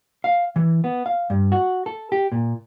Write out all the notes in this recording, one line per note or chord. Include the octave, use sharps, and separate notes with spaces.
F5
E3
B3
F5
G2
F#4
A4
G4
A#2